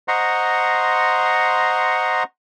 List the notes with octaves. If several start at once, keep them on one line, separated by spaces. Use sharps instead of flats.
C5 D#5 F#5 A#5 C6 C#6